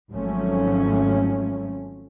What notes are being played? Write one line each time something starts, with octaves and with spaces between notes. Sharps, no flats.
G#1 G#2 F3 F#3 A3 C#4